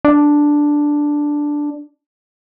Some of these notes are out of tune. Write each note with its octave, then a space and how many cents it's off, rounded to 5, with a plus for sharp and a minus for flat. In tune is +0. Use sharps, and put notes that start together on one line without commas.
D4 +0